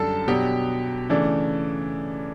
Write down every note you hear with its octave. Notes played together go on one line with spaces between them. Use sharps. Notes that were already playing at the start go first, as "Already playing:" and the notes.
Already playing: F#2 D3 G3 A4 A5
B2 F#3 B3 D4 G4 G5
C#3 E3 A3 D4